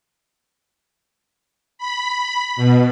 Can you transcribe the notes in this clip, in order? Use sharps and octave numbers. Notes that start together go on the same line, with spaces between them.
B5
B2